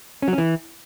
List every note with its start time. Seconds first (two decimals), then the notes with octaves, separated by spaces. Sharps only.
0.22 C#4
0.28 F#3
0.33 C#4
0.38 E3